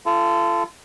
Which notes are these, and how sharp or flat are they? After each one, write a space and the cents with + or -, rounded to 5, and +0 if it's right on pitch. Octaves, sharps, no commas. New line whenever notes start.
F4 -35 A4 +0